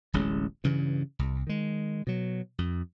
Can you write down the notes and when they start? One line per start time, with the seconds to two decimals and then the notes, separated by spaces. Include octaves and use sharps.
0.13 D1 A1 G#3 C#4
0.64 G2 C#3 E3
1.19 C2
1.47 D#3 G#3
2.07 B2 F#3
2.58 F2